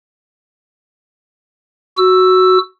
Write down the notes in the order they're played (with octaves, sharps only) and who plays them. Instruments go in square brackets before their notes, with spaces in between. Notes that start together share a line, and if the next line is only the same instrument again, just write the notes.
[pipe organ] F#4 E6